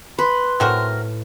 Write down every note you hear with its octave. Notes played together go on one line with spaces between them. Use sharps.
B4 B5 C6
A2 C4 F#4 A#4